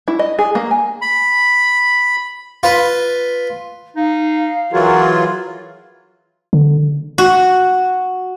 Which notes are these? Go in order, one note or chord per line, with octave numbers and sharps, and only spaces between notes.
E4
D#5
G#4
A#3
G#5
B5
F4 B4
D#4 F5
E3 F#3 F4 F#4 G#4 A#4
D3
F#4